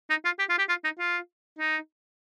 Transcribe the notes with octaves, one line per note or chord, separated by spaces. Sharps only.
D#4
F4
G4
F4
G4
F4
D#4
F4
D#4